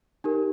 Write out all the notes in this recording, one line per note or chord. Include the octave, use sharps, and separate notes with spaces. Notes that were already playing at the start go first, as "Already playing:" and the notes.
D#4 G4 A#4